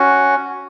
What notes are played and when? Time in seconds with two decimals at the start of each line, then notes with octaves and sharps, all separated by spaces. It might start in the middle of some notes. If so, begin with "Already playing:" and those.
Already playing: C#4 F#4